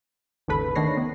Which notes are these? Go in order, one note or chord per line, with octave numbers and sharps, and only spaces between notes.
G#1 D#2 C#3 A4 B4 B5
D#3 A3 D4 C#5 A#6 C7
B3